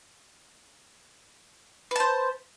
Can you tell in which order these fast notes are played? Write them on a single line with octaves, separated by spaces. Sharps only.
B4 A5 C5